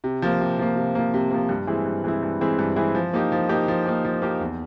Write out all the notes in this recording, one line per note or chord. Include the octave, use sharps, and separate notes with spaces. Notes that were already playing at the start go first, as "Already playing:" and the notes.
C3
F3 A#3
C3
F3 A#3
C3
F3 A#3
C3
F3 A#3
G2
E3 G#3 C4 E4
G2
E3 G#3 C4 E4
G2
E3 G#3 C4 E4
G2
E3 G#3 C4 E4
F3
A#3 D#4 G4
F3
A#3 D#4 G4
F3
A#3 D#4 G4
F3
A#3 D#4 G4
E2